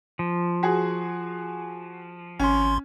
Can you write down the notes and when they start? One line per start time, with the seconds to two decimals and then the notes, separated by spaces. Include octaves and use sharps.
0.19 F3
0.63 F#4 G#4
2.39 G#1 C#4 C6